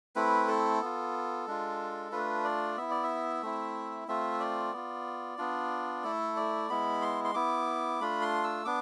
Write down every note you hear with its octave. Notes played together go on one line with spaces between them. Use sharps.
A3 C4 E4 B4
A4
B3 F4
G#3 D4 F4
A3 D4 F4 B4
D5
B3 E4 E5
D5
E5
A3 C4 E4
A3 C4 F4 E5
D5
B3 F4
B3 D4 F4
A3 E4 A4
D5
G#3 B3 E4 B5
C6
C6
B3 E4 D6
A3 D4 F4 B5
C6
E6
B3 D4 D6